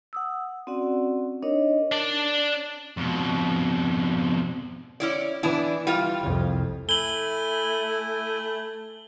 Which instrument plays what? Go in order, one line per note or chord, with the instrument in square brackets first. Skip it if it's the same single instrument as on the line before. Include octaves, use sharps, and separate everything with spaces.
[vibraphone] F#5 D#6 E6
C4 C#4 F#4 D5 F#5
D4 D#4 A#4 C#5 D#5
[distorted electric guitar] D4 D5
F2 B2
[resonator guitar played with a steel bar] C#4 E4 D5
[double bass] E3 [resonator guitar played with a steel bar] B3 D4 E4
[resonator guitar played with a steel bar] G3 F4
[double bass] C2 F2
[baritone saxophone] A3 [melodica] E4 G#5 [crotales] F#7 G7